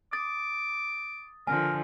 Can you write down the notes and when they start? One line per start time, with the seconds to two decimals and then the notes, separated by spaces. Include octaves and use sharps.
0.13 D6 D#6 A6
1.47 D3 F3 A#4 G#5